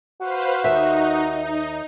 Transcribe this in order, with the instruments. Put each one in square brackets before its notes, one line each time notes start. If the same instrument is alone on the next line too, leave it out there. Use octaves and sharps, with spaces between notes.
[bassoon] F#4 [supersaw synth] B4 C5 F5
[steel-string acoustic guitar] D#2 E5 [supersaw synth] D#4
[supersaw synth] D#4